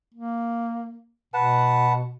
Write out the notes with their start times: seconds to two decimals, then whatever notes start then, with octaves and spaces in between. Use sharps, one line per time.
0.15 A#3
1.34 B2 B4 F#5 A5